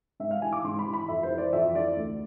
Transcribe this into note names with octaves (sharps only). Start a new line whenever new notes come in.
G#2 E5
F5
E3 G#5
D6
G#2 C6
B5
E3
B5
F2 E5
C5
E3
D5
F2 E5
E3 D5
D2